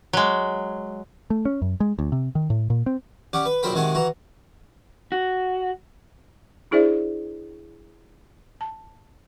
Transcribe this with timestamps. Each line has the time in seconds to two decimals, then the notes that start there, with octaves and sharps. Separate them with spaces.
0.13 F#3 G#3
1.30 A3
1.45 C#4
1.62 F#2
1.80 G#3
1.99 D2
2.12 C3
2.35 D#3
2.50 A2
2.70 A#2
2.86 C4
3.33 C#4 G4 D5 F#5
3.46 B4
3.63 A#1 F#3 A#4 C5 G5 B5
3.74 C3 D#3 G#3 F#4 G#5 A5
3.95 E3 F#4 A#5
5.12 F#4
6.71 D4 E4 G#4 C5 D5 E5
8.61 A5